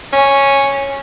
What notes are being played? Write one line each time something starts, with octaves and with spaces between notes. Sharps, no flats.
C#4